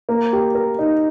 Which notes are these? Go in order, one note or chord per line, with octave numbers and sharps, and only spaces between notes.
A#3
G4
A#4
D#4